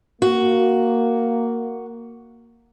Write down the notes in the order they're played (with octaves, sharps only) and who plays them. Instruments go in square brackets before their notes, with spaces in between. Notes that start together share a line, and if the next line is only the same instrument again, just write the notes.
[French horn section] A#3 [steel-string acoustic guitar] F#4